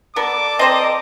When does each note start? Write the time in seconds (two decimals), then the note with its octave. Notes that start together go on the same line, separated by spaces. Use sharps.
0.16 B3 A4 A#4 D5 A5 D6
0.59 C4 C5 D#5 A#5